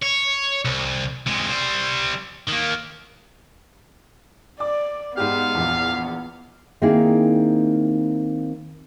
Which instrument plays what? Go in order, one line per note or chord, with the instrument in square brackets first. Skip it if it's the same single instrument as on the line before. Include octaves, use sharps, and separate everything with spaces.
[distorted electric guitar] C#5
C2
C3 G#3
G3 C5
D#3 A#3
[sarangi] D5 [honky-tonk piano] D6
[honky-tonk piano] G#2 G4 [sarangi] B3 [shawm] F5
[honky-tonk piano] A#1 E2
[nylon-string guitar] D#3 A#3 C4 D#4 E4 G#4